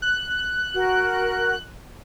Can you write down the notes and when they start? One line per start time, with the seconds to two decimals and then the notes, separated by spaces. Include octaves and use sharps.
0.02 F#6
0.75 F#4 A#4